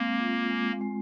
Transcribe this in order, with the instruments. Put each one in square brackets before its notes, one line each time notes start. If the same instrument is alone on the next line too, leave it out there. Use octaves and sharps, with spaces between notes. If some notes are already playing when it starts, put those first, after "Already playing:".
Already playing: [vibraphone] G#3 C4 [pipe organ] A#3
[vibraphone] F4
G#3
G#3